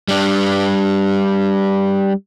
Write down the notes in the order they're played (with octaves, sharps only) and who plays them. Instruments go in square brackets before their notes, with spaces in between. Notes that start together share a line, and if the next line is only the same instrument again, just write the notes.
[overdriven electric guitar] G3 D4